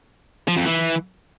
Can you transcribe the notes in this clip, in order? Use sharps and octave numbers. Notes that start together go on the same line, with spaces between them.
F3
F2
E3